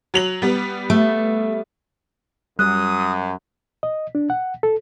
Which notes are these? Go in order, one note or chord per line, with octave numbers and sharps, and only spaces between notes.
F#3 F7 F#7
G3 B3
A3
F#2 G3 D#6 F#6
D#5
D4
F#5
A4